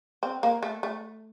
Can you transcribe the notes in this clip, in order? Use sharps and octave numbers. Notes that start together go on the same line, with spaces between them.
C4
A#3
A3
A3